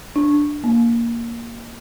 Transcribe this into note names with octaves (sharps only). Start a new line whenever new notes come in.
D4
A#3